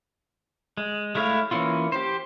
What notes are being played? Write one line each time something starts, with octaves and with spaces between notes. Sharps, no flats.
G#3
G#3 A3 E4 C#5 F5
E3 A#3 C#4 E4 F4
G4 C5